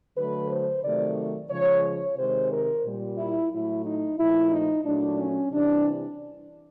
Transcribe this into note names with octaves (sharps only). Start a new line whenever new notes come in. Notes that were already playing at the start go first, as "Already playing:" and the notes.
D3 F#3 A3 B4
C5
C3 D#3 F#3 A3 D5
C#3 F3 G#3 C#5
C#5
C3 D#3 G#3 C5
A#4
A#2 G3
E4
A2 F#3 A3 E4
D#4
A#2 F3 A3 E4
D#4
A#2 F#3 A3 D4
C#4
C3 E3 G3 D4